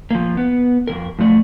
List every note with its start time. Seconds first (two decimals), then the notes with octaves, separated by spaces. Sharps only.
0.11 F3 A#3
0.37 B3
0.87 F2 D#3 A#4
1.19 F#2 F3 A3 D5